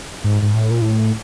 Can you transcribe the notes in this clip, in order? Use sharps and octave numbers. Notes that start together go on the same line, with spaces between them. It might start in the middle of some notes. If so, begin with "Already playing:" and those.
G#2
G#2
A2
A#2
A2